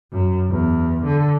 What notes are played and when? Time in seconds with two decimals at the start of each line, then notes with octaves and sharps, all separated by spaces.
0.12 F#2
0.50 E2
1.04 D3